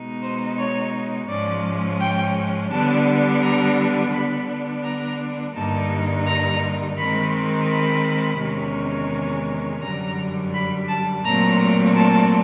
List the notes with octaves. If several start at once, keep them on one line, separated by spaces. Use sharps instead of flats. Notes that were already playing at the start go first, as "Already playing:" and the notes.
Already playing: B2 G#3 B3 D#4
C5
C#5
G#2 F3 G#3 C#4 D5
G5
D3 G3 B3 D4 A5
A#5
D3 G3 B3 D4 B5
A#5
G2 D3 G3 A#3 D#4 A5
A#5
D#3 G#3 C4 B5
B5
E2 C3 D#3 G#3 C#4
F#2 D3 G3 A#5
B5
A5
A#2 F#3 A3 C4 A#5
A5